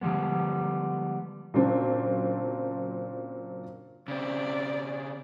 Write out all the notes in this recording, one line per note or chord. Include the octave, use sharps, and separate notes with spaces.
D3 F3 G3 G#3 B3
A#2 C#3 F#3 C4 D4
C#3 C4 D5